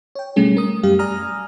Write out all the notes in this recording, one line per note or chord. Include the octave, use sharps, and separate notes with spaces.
C#5 G5
B2 G3 A3 C#4 G#4
A#4 D#6
F#2 G3 G4 F5
D5 G#5 A#5 D#6 F6